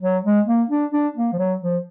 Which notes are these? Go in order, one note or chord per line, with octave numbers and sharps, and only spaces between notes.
F#3
G#3
A#3
D4
D4
A#3
F3
F#3
F3